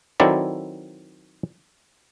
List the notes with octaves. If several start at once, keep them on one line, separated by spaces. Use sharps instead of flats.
D#3 F#3 C4 E4 A4 D5